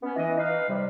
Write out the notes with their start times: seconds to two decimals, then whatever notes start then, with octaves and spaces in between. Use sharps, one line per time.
0.03 B3 C#4
0.16 E3 D#5
0.38 D#4 B4 F5
0.68 C3 G3